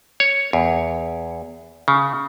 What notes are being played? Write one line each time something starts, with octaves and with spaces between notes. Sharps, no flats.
C#5
E2
C#3